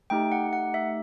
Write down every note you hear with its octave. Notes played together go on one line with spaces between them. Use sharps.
A3 D#4 G4 G5
F#5
F#5
E5